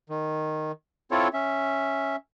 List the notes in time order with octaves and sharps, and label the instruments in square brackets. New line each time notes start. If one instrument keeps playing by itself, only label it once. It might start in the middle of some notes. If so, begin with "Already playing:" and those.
[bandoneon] D#3
C4 E4 F4 A4 C#5
C#4 E5